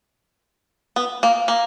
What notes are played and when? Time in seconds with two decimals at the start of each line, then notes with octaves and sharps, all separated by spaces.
0.96 B3
1.23 A#3
1.48 A#3